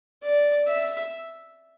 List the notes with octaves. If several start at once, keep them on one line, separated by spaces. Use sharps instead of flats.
D5
E5